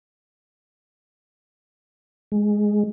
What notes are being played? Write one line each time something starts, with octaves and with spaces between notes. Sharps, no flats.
G#3